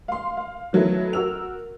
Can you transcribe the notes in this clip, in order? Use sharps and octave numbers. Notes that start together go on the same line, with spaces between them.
F5 C6
F5
D#3 F#3 A3 B3 E4
F#4 A#4 E6 F7